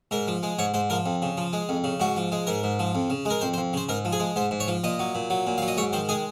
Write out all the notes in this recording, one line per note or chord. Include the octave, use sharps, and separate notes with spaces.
G#2 A#4
F3
G#3
G#2 C#5
G#2 C5
F3 A#4
F2
C#3
F3
G#3
F2
C#3
G#2 F#4
F3
G#3
G#2 A#4
G#2
F3
F2
C#3
G#3 A#4
F2 C5
C5
F2
C#3 C5
G#2 A#4
F3
G#4
G#3
G#2 C5
G#2
C#5
F3
A#2 D#5
F#3
A#2
F#3
A#2
F#3 F5
D#5
G#2 C#5
D#3 C5
G#3 G#4